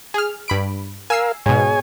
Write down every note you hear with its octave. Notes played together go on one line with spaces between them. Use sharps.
G#4 F6
G2 B5 D7
A#4 F5 G#5 E6 C7
G#2 B2 G#4 C#5 G#5